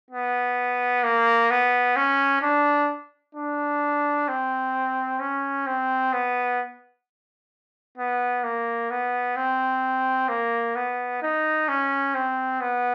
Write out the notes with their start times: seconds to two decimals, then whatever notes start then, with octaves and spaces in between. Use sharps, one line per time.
0.11 B3
1.04 A#3
1.51 B3
1.96 C#4
2.42 D4
3.35 D4
4.28 C4
5.20 C#4
5.67 C4
6.13 B3
7.98 B3
8.44 A#3
8.91 B3
9.36 C4
10.29 A#3
10.76 B3
11.22 D#4
11.68 C#4
12.15 C4
12.61 B3